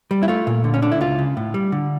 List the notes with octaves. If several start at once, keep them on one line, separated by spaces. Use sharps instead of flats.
G3
E4
A3 F4
A#2
D3
C#4
D3 D4
E4
C#2 F4
C#3
A2
G3
D3